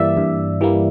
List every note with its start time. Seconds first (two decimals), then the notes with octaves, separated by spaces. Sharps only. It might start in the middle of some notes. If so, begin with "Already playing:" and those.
Already playing: G2 E3 G3 A#3 D5 E5
0.17 G2
0.61 E3 G3 A#3